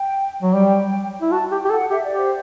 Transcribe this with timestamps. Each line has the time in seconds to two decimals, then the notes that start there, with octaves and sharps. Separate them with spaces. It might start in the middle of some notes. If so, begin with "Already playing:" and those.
Already playing: G5
0.42 F#3
0.53 G3 G5
1.21 E4
1.31 F#4 A5
1.51 G4 G5
1.65 G4
1.70 A4 F#5
1.90 G4 E5
2.04 D5
2.09 G4
2.17 C5